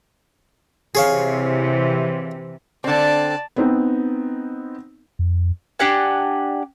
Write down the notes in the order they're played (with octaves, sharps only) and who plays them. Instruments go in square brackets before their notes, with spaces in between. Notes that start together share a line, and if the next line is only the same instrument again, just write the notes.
[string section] C3 E3 [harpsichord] G#4 C#5 F5
[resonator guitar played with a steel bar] D3 C4 [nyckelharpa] D5 A5
[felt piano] B3 C4 D#4
[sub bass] F2
[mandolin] D4 G4 F#5 G#5